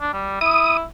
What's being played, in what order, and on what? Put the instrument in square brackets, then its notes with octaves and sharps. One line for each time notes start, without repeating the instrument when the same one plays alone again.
[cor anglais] D4
G3
[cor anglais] E4 [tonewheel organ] D#6